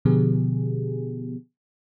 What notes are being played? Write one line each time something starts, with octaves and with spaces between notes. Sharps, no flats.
B2 D3 F3 B3 G4 G#4